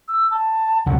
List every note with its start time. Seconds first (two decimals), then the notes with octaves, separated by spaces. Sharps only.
0.08 E6
0.31 A5
0.86 C#2 C3 F#3 F#5